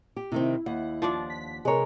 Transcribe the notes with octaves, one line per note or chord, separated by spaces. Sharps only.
G4
C3 D#3 C4 E4
D#2 F#5
F3 D4 D5
B6
C3 G#3 A#4 B4 C#5